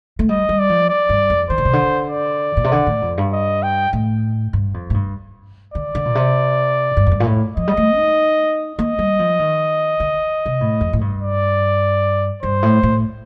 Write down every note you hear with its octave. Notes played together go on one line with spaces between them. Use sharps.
A3
G3 D#5
G3
D5
F3
D5
G2
F2
D#3 C5
D3
C3
D3
D5
A#2
C3
D3
A2
F2
G2
D#5
G5
A2
G2
F2
A2
G2
D3 D5
D3
A#2
C3
G2
F2
G2
A#2
A2
F3 D#5
G3
A3
D#4
A#3 D#5
G3
F3
D#3
D3
C3
A2
F2
A2
G2
D5
G2 C5
A2
A2